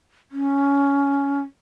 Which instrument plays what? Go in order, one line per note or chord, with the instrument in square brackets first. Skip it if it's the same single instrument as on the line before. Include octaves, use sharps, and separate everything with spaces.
[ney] C#4